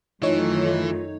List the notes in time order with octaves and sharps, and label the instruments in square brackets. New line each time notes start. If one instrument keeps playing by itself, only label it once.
[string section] F#2 D#3 A3 [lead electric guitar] E3 [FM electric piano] D#4 C#5 [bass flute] F4